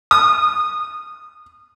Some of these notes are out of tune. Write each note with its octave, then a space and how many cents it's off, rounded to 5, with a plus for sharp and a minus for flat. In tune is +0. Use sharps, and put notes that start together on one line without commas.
D#6 -25